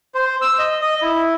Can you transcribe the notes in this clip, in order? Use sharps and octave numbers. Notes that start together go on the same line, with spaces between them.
C5
E6
D#5
D#5
E4